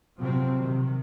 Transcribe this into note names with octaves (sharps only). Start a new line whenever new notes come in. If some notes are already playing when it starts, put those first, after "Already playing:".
C3 F3 F#3 C4
C3 D#3